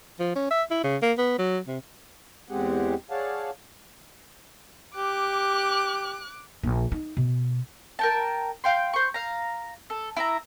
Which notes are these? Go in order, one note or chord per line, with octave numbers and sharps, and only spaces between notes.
F3
C#4
E5
E4
C#3
A#3
B3
F#3
C3
E2 G#3 C4 G4 G#4 F#5
G#4 C#5 D5 F5 F#5 A5
G4 D6 F#6
A#1
D#4
B2
A#4 G5 A5
F5 G5 C6
C5 C#6
F5 A#5
A4
E4 E5 A#5